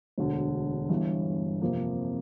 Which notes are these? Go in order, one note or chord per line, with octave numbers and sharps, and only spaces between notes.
E1 D2 D3
G1 G2 E3
F2 C3 F3 A#3